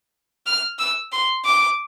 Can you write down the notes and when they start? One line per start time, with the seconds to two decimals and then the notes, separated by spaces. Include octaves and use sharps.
0.46 F6
0.79 E6
1.12 C6
1.45 D6